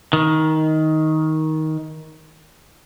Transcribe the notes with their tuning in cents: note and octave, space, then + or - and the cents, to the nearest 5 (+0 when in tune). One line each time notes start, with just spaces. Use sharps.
D#3 +15